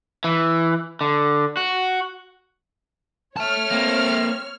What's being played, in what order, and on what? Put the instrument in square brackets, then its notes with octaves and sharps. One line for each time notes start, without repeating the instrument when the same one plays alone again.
[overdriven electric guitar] E3
D3
F#4
[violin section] C#5 F6 [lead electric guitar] E5 A5
[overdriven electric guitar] A#3 C4